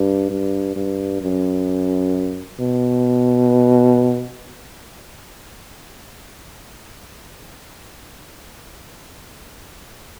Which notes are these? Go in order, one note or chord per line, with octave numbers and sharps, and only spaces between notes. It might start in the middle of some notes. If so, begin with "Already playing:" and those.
Already playing: G2
G2
G2
F#2
B2